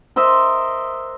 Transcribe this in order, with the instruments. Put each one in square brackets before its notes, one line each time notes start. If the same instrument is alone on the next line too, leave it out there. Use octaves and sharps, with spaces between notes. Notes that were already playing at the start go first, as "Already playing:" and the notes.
[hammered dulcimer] A#4 C5 D#5 E5